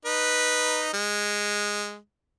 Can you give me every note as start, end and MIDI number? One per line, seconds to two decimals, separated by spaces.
0.05 0.88 63
0.05 0.88 71
0.93 1.96 56